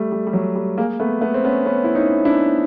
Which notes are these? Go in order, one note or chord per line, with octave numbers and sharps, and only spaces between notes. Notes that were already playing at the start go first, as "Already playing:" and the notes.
Already playing: G3 A3
G3
G3
F#3
G3
G#3 A#3
A3 B3
A3 B3
C4
B3 C#4
B3 C#4
E4
C#4 D#4
D4 E4